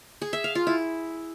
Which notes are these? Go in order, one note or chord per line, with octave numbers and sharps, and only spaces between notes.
G#4
E5
F5
F4
E4